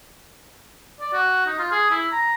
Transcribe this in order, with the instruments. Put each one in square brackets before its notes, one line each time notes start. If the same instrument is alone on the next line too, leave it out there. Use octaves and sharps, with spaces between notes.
[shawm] D5
F#4
D#4
F4
G#4
E4
A#5